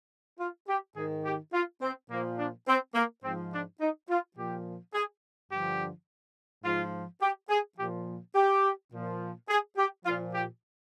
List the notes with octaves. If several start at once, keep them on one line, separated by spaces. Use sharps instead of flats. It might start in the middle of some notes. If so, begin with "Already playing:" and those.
F4
G4
G#2 D#3 G#4
G4
F4
C4
A#2 F3 A#3
D4
C4
A#3
G#2 F3 C4
D4
D#4
F4
A#2 F3 G4
G#4
G2 D3 F3 G4
G#2 F3 F4
G4
G#4
A#2 F3 G4
G4
A#2 F3
G#4
G4
A#2 F3 F4
G4